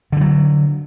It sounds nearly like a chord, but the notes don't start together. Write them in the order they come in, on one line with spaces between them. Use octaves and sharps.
D3 E3 F#3